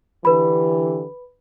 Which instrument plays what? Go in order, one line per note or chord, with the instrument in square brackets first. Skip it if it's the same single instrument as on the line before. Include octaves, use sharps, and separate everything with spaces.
[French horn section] D3 E3 G4 [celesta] B4 B5